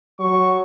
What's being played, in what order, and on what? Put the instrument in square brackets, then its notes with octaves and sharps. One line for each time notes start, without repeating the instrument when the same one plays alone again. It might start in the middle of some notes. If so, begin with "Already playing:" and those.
[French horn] F#3 [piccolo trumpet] C#6